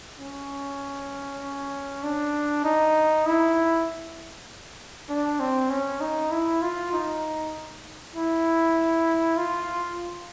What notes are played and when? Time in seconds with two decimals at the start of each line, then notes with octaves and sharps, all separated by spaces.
0.20 C#4
2.03 D4
2.64 D#4
3.26 E4
5.09 D4
5.40 C4
5.70 C#4
6.01 D#4
6.31 E4
6.62 F4
6.93 D#4
8.15 E4
9.37 F4